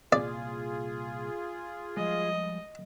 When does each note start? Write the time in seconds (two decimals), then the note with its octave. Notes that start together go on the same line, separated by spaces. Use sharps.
0.12 C2 A#2 F4 G#4 D5
1.97 F3 G3 G#3 D#5